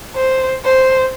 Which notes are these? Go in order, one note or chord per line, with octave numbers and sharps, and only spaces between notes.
C5
C5